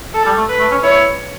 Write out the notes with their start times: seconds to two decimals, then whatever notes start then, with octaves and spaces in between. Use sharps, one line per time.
0.14 A4
0.26 G3
0.37 A3
0.49 B4
0.60 A3
0.71 C#4
0.83 E4 C#5